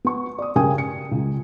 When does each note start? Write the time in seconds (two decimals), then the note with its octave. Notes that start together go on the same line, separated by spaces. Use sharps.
0.05 B3 C#6
0.38 D5 D#6
0.56 G2 C#3 A#4 G5 G#5 D#6
0.78 C#7
1.12 C#2